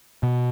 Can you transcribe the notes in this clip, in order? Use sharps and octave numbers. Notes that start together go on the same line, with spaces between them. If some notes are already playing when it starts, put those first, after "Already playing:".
B2